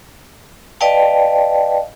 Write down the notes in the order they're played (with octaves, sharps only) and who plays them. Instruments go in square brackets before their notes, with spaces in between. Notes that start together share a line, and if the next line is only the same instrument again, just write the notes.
[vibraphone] B4 D5 D#5 F5 G5 A5